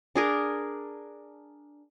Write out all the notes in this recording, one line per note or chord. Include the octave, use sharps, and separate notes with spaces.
D4 G#4 A#4